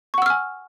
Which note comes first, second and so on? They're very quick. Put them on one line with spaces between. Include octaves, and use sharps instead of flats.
C#6 F#5 E6 F6 G#5